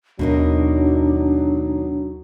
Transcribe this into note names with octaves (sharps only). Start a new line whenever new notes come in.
D#2 B2 D#3 F#3 D4 D#4